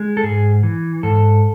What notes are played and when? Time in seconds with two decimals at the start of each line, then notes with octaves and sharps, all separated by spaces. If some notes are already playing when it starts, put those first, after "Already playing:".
Already playing: G#3
0.17 A4
0.23 G#2 G#4
0.63 E3
1.03 G#2 A4